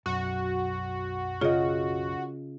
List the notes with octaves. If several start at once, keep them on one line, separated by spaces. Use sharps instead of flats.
B1 F#2 F#4
C#3 F4 D#5